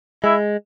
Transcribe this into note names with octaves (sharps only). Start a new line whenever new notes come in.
G#3 E4